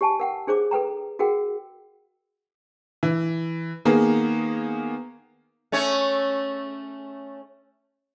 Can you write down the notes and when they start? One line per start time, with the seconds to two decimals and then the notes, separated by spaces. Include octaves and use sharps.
0.01 G4 C#5 G#5 A5
0.20 A#4 F#5 G5
0.47 D4 G#4 C5 C#5 D6
0.71 A4 B4 G5 A#5
1.19 F#4 G#4 A#4 F#5 G5
3.03 E3
3.85 D#3 A#3 B3 G#4
5.72 A3 C#4 C#5